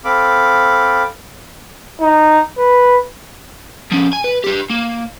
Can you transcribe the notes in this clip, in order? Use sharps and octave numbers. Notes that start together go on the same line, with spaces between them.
C4 A4 F5 B5 D6
D#4
B4
F3 C#4
G#5
B4
D4 G4
A#3